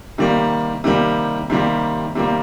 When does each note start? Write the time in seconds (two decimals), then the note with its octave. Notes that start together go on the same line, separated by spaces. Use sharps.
0.18 C3 D#3 G3 A#3
0.84 C3 D#3 G3 A#3
1.50 C3 D#3 G3 A#3
2.15 C3 D#3 G3 A#3